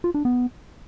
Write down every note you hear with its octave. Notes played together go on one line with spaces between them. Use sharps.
F4
D4
B3